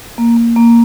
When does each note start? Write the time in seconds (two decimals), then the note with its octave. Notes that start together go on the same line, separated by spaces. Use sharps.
0.18 A#3
0.37 A#3
0.56 A#3